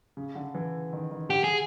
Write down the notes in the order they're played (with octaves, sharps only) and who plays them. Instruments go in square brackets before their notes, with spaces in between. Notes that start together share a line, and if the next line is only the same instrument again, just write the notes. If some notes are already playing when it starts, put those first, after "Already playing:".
[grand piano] C#3
D3
E3
D#3
D#3
[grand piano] D3 [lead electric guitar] G4
[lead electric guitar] G#4